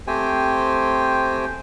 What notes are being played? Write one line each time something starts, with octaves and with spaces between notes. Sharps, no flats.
A3 C4 G4 C5 G5 G#5